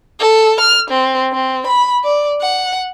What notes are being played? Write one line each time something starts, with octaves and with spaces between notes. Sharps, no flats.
A4
F6
C4
C4
B5
D5
F#5